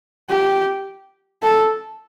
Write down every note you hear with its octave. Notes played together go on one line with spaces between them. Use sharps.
G4
A4